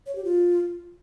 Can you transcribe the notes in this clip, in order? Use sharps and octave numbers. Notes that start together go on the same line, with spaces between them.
C#5
G4
F4